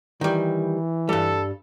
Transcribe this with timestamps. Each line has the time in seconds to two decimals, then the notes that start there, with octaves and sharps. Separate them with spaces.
0.21 D#3 E3 G3
1.09 G2 G3 A4